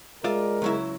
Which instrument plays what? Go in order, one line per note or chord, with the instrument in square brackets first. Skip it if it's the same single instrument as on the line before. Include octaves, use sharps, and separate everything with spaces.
[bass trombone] G#3 [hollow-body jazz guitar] F4 D5 E5 [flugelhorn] A#4
[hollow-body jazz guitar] C#2 F#3 E4